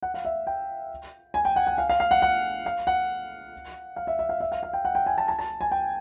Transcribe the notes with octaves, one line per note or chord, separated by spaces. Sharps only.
F#5
F5
E5
G5
G#5
G5
F#5
F#5
F5
F5
F5
F#5
F#5
F5
F#5
F5
E5
E5
F5
E5
F5
F5
G5
F#5
G5
G#5
A5
A5
A5
G#5
G5